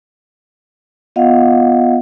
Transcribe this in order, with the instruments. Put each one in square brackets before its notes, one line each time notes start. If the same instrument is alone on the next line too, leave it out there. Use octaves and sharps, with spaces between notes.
[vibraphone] B3 F4 D#5 F5 F#5